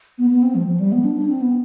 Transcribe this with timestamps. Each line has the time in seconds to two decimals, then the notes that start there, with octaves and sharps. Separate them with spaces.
0.18 B3
0.30 B3
0.43 C4
0.55 F3
0.67 F3
0.80 G3
0.92 B3
1.05 D4
1.16 D4
1.29 C4
1.41 B3